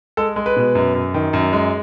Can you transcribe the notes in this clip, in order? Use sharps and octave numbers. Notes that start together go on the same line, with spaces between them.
G#3 A4
G#3
B4
B2
F#2
F#2
D#3
F#2
G#3